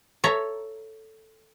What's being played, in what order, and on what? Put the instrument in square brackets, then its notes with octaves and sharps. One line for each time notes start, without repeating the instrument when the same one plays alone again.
[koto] A4 C#5 E5 A#5